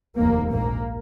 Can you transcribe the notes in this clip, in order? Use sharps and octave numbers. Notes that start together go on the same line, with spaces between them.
F1 D#2 A#3
A#1 G#2 A#3